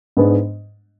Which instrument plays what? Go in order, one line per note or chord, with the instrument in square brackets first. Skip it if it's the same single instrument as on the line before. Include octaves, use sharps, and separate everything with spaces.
[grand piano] G#2 G#3 B3 D4